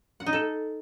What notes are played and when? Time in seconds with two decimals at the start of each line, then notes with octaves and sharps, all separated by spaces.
0.20 F#5
0.26 D#4
0.33 A4